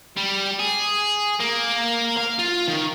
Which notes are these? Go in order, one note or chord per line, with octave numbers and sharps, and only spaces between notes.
G3
G#4
A#3
F5
F4
D#3